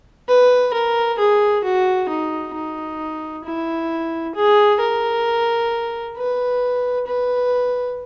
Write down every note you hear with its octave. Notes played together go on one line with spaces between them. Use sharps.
B4
A#4
G#4
F#4
D#4
D#4
E4
G#4
A#4
B4
B4